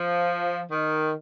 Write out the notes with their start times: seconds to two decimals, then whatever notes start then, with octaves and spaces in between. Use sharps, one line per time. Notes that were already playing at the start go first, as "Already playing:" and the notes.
Already playing: F3
0.71 D#3